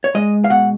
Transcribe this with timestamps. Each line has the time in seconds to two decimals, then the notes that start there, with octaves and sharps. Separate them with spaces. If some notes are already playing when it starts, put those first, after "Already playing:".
0.04 C#5
0.15 G#3 D#5
0.44 F5
0.50 B2 F#5